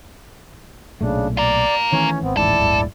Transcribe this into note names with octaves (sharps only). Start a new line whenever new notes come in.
B1 A#2 C#3 A3 D4
F4 A#4 D5
D#3 E3 A3 C#4 C#5
G#1 B3 C4
D#1 A1 G#2 E4 A4 D5
D1 G1 G#3